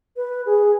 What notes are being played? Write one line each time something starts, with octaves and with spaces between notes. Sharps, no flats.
B4
G#4